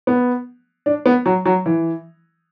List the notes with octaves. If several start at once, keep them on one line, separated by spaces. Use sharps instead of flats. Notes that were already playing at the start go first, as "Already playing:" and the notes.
B3
D4
B3
F#3
F#3
E3